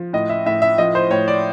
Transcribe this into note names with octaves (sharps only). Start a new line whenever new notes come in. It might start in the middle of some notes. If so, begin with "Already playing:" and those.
Already playing: F3
A2 D#5
E5
A2 E5
E5
F3 D#5
C5
A2 C#5
D5